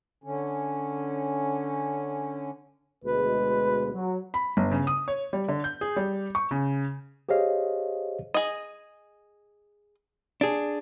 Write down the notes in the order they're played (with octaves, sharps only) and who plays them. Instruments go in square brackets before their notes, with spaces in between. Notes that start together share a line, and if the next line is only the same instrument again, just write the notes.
[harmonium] D3 C#4
[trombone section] D2 B2 G#3 [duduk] B4
[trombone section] F#3
[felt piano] B5
G1
C#3
D#6
C#5
G3
D3
G6
G#4
G3
C#6
C#3
[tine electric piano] G4 G#4 C5 C#5 D#5 F5
[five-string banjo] G#4 D#5
[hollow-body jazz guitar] D4 G#4